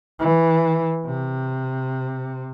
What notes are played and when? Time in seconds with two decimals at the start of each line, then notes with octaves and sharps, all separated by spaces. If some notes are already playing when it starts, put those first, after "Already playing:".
0.19 E3
1.06 C3